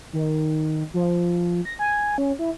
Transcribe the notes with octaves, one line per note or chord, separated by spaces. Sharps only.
D#3
F3
A#6
G#5
C#4
E4